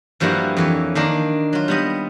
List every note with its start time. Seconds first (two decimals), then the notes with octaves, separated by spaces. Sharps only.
0.20 G2 F3 G3 A#3 E4 F#4
0.57 F2 E3 C#5
0.95 D#3 A#3 D4 A#4
1.53 F#3 F4
1.68 G3 B3 D#5